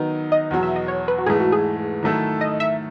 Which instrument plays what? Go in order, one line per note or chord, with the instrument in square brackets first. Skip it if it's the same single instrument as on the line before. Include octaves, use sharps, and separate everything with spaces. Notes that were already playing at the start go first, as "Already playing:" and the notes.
Already playing: [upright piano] D#3 F#3 B3 D#4
[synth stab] D#5
[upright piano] E2 B2 F#3
[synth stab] E5
D#5
C#5
B4
F#4
[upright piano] G#2 E3 A3 [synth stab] G#4
[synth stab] F#4
G#4
[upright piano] D#3 F#3 A3 E4 A4
[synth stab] D#5
E5